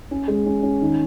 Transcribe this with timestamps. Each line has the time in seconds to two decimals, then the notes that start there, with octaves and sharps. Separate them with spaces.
0.11 C#4
0.28 G#3
0.46 C#4
0.63 C#4
0.81 D#3